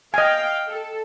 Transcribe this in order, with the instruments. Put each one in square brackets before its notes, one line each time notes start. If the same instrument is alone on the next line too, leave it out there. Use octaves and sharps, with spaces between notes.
[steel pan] D#5 G#5 [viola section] F5 G5
[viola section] A4